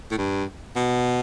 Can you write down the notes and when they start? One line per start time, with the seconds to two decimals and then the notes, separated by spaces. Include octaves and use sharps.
0.11 A2
0.18 G2
0.76 B2